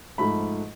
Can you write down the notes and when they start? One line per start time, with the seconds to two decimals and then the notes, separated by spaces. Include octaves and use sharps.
0.18 G#2 F3 A3 B5